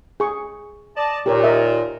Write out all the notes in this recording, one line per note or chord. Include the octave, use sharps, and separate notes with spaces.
G#4 C#6
D5 D#5 A5
D#2 A#2 G4 A#4 C#5
A#4 D#5 E5